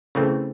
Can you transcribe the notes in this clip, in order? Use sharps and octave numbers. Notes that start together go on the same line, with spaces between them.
C#3 E3 A3 C4